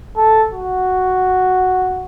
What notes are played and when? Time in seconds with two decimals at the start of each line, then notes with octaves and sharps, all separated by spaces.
0.17 A4
0.53 F#4